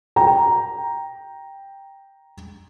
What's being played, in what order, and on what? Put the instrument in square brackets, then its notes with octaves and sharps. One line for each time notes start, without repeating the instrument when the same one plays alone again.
[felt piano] G5 A#5